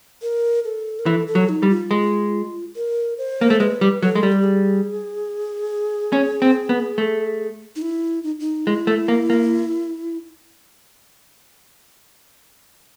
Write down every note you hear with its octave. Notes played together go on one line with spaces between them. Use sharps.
A#4
A4
A#4
E3 A4
A4
F#3
D#4
G3
F4
G#3
A#4
C5
A#3
A3
G#3 B4
G3
F#3 A4
G#3
G3
G4
G#4
C#4
C4
B3
A3
D#4
E4
D#4
D#4
G#3 E4
A3
A#3
A#3